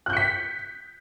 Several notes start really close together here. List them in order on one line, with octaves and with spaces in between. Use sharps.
F#6 G6 C#7 B6